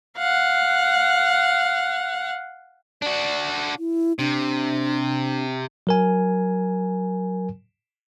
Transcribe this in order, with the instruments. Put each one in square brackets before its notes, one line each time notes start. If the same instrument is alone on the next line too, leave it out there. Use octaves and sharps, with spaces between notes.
[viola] F5 F#5
[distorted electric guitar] D4 F#4 [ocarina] D5
[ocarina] E4
[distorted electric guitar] C3 [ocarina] D4
[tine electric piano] F#3 A#4 G#5